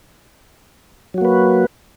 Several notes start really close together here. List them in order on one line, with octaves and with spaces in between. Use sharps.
F#3 F#4 A#3 B4